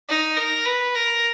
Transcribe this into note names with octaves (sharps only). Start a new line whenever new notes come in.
D#4
A#4
B4
A#4